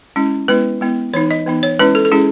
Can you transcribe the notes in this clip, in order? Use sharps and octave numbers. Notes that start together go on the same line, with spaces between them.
G#3 C#4 E4
G#3 B3 E4 B4
G#3 B3 E4
E3 B3 D#4 C#5
D#5
E3 B3 D#4
C#5
G#3 C#4 E4 B4
A4
A4
G#3 C#4 E4 G#4